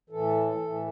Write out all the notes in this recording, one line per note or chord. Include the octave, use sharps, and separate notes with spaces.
A2 E3 A4
A2 E3